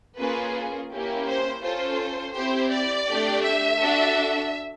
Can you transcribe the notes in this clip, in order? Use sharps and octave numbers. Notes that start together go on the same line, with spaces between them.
A#3 C#4 F4 G#4 B4
A#3 C#4 E4 G4
C5
C#4 F4 A4 C5
C4 E4 G4 C5
D5
A3 D4 G4
E5
D4 F#4 A4